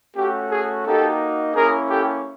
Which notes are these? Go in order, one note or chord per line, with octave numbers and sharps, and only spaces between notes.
A3 C#4 F#4 G4
G#4
A#3 D#4 F#4 G4 A4
A#3 C#4 E4 G#4 A#4
G4 A4